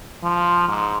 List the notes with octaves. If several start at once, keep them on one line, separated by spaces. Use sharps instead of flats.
F3
G#2